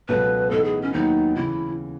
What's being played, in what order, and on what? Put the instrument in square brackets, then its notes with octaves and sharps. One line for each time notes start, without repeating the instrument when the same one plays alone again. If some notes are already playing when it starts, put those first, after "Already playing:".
[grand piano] C#2 B2 F#3 A3 [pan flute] B4
[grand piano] A2 E3 B3 D#4 [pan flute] A4
[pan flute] G#4
C#4
[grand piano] D#2 D#3 F#3 B3 [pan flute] D#4
[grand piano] C#3 E3 [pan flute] E4